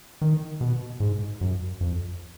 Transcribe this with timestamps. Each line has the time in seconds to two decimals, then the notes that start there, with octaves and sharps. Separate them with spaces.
0.22 D#3
0.61 B2
1.00 G#2
1.41 F#2
1.81 F2